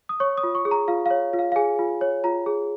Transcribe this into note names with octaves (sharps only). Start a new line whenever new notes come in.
D#6
C#5 C#6
D#6
F4
C#6
G#4
A#5
F4 F5
C#5 F5
F4
F5
F5
G#4 G#5
F4
C#5
F4 A#5
G#4